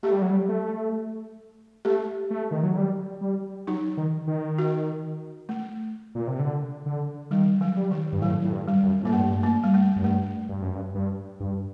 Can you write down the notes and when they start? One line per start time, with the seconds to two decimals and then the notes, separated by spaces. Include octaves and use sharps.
0.03 A3 G4
0.12 G3
0.22 F#3
0.30 G3
0.49 A3
1.85 A3 G4
2.30 A3
2.51 D#3
2.63 F#3
2.77 G3
3.21 G3
3.67 F#3 D#4
3.97 D#3
4.27 D#3
4.58 F#4
5.49 A3
6.15 A#2
6.27 C3
6.39 D3
6.86 D3
7.30 D#3 G3
7.61 F#3
7.76 G3
7.91 D#3
8.13 G2
8.21 A2 F#3
8.45 A2
8.52 G2
8.68 G3
8.83 F#2
9.03 A2 A#3
9.13 G2 A3
9.43 A#3
9.64 G3
9.74 A3
9.96 F#2
10.03 G2 A3
10.49 G2
10.62 F#2
10.74 G2
10.95 G2
11.40 G2